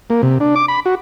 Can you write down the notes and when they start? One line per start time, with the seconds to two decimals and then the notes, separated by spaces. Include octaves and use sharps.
0.10 A#3
0.23 C3
0.40 D4
0.56 D6
0.68 B5
0.86 F#4